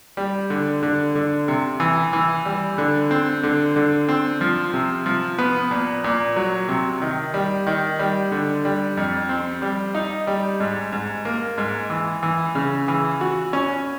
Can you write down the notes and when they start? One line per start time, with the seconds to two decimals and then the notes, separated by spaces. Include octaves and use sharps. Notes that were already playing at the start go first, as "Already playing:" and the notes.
0.17 G3
0.50 D3
0.83 D3
1.15 D3
1.48 C3
1.80 E3
2.13 E3
2.45 G3
2.78 D3
3.11 C4
3.43 D3
3.76 D3
4.09 C4
4.41 F3
4.73 C3
5.06 F3
5.39 B3
5.71 A#2
6.04 A#2
6.36 F#3
6.69 C3
7.02 D#3
7.34 G3
7.67 D#3
7.99 G3
8.32 D3
8.65 G3
8.97 F2
9.29 C4
9.62 G3
9.95 D#4
10.27 G3
10.60 G#2
10.92 G#2
11.25 A#3
11.58 G#2
11.90 E3
12.23 E3
12.55 C#3
12.88 E3
13.21 F#4
13.53 C#4